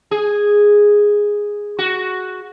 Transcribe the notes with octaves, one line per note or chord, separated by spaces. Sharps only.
G#4
F#4